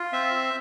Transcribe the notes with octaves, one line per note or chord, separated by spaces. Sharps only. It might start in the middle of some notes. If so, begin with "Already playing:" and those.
Already playing: F4
C4 E5